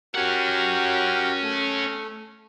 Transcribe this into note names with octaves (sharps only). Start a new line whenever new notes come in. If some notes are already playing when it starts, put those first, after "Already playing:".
C#4 F#4 G4 A#4 F#5
A3